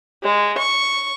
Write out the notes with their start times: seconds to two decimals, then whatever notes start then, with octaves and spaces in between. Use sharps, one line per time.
0.23 G#3
0.58 C#6